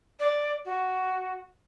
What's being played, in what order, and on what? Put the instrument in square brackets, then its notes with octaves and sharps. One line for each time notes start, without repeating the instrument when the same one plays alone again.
[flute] D5
F#4